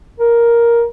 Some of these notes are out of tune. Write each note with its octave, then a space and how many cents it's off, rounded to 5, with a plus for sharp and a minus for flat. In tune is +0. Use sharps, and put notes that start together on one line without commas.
A#4 +5